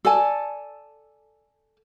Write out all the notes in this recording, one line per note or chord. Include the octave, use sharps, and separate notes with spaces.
A4 D5 G#5 A5